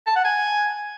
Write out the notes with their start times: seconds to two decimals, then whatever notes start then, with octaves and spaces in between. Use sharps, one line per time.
0.07 A5
0.15 F#5
0.24 G#5